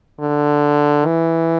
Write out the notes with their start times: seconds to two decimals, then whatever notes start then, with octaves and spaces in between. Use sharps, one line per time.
0.21 D3
1.06 E3